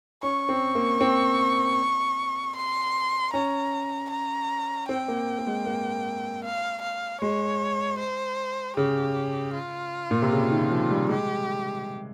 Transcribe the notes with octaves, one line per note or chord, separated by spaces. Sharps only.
C#4 C#6
C4
A#3
C4
C6
C#4 A#5
A#5
C4 G5
A#3
A#3
G#3
A#3
F5
F5
G#3 C#5
C5
C#3 G4
F4
A#2
C3
C#3
D#3
F3
G3
G#3 G4